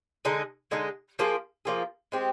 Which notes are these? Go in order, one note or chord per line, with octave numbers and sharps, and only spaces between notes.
D3 G#3 D#4 G#4
D3 G#3 D#4 G#4
F3 A#3 F4 G#4
F3 A#3 F4 G#4
G#3 C4 G4